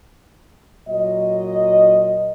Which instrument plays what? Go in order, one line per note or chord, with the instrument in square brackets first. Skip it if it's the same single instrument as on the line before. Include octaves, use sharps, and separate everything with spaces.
[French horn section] A#2 F#3 D#5